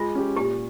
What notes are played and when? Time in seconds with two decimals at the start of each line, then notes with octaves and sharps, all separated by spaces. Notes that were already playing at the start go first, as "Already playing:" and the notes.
Already playing: G#3 F4
0.15 C#4 G4
0.36 A#2 G4